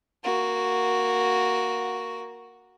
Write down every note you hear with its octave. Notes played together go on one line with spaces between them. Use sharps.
A#3 F#4